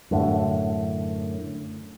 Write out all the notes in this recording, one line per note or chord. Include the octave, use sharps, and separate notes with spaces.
F#2 A2 D3